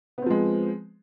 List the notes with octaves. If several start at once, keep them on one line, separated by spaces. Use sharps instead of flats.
F3 G#3 B3 C4